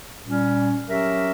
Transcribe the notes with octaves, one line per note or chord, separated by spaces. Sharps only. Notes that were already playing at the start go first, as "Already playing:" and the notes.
A#2 G3 C#4
F#3 C#4 G4 A#4 E5